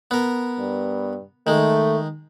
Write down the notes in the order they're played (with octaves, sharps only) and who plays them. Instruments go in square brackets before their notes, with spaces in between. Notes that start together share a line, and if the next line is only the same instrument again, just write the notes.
[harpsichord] B3 A#4
[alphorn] G2
[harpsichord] D#3 G#3 [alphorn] A3